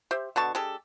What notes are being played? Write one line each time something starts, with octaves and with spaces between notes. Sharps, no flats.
G4 C5 E5
B2 D3 A5 C#6
G#3 D4 G4 A4